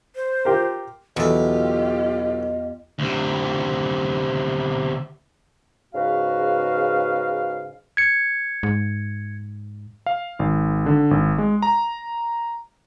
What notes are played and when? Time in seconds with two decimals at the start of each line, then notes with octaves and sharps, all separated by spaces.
0.16 C5
0.45 F4 G4 A#4
1.17 B1 E2 F4 G4 A4 D#5
2.99 D2 C3
5.94 G#2 C#3 F#4 B4 F5
7.97 G#6 C#7
8.63 G#2
10.06 F5
10.39 G#1
10.86 D3
11.11 G#1
11.38 G#3
11.62 A#5